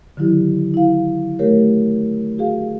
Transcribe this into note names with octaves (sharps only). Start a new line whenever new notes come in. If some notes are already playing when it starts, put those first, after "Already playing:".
D3 D#3 F#3 E4 G4
E4 F5
A3 G4 A#4 C#5
F#4 G#4 F5